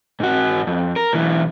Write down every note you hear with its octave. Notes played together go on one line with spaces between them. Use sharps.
G#2 F#4
F2
A#4
B1 E3